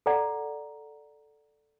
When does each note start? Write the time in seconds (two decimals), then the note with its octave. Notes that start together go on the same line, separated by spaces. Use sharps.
0.06 A4 D5 F#5 A#5